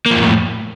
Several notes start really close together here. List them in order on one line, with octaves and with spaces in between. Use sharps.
A#3 F3 F2 A2